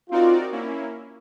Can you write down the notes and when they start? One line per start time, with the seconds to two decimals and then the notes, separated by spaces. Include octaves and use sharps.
0.10 C4 D#4 F4 F#4 A#4 D5
0.52 A#3 C#4 E4